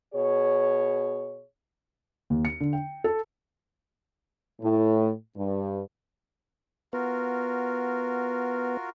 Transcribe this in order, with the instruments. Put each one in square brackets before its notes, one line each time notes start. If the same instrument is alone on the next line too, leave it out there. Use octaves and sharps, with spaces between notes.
[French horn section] B2 G#4 C#5
[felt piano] D#2
C#7
D3
G5
A4
[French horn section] A2
G2
[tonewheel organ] B3 [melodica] F4 F#4 A#4